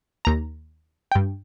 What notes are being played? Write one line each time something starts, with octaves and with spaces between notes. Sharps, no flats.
D#2 A#5
G2 G5